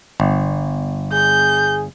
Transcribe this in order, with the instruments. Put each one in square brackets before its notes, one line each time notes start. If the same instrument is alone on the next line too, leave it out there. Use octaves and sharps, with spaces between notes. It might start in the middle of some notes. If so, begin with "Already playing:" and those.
[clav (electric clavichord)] G1
[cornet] G#4 [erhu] G6